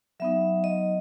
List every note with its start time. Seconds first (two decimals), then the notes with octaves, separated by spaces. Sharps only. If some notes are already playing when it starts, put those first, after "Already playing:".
0.20 F#3 B3 D#4 E5
0.64 D#5